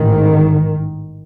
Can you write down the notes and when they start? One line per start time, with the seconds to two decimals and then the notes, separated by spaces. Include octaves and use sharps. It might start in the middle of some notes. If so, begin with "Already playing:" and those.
Already playing: A1 G#2 D#3